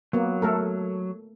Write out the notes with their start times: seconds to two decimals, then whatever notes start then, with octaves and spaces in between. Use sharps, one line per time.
0.13 F#3 A#3 B3
0.42 A3 A4 A#4